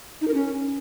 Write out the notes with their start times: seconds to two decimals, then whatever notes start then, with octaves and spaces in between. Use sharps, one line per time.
0.21 D#4
0.28 A#4
0.34 C#4